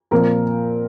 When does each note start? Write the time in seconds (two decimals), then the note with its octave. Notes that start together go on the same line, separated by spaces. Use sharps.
0.11 A#2 F3 C4 A#4